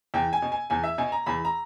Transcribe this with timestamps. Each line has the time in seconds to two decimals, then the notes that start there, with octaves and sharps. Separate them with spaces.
0.14 E2 G5
0.33 G#5
0.42 B2
0.52 G#5
0.70 E2 G#5
0.84 E5
0.98 B2 G#5
1.12 A#5
1.26 E2 B5
1.45 A#5